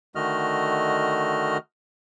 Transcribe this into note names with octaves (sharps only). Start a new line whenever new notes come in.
D3 D#3 A3 F#4 D#5 F6